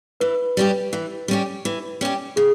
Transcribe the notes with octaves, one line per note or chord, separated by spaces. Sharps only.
E3 B4
G3 C#4 G4
E3
G3 C#4 G4
E3
G3 C#4 G4
C#3 G#4